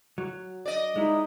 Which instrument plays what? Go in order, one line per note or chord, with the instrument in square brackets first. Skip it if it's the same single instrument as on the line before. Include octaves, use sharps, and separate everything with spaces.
[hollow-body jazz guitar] F#3
[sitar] D5 D#5
[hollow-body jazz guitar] G#3 E4 [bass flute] D#4